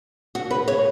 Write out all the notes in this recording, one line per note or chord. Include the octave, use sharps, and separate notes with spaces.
F#4
B4
C#5